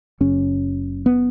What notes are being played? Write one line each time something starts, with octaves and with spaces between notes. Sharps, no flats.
F#1 F#2 C#3 C#4
B3